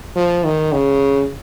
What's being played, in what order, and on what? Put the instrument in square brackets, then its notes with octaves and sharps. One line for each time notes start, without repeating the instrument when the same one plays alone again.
[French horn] F3
D#3
C#3